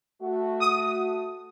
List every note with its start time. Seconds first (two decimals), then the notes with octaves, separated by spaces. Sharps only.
0.22 A3 F#4
0.60 D#6